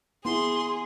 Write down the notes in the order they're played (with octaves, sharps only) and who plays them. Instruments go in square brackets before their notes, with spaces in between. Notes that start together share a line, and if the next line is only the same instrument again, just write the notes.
[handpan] B3 E4 [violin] G#4 [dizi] C6